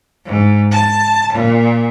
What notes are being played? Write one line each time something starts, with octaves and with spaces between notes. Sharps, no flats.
G#2
A5
A#2